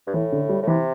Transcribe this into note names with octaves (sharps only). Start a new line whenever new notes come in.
G2
A2 E3
D3
G3
A2
C3 E3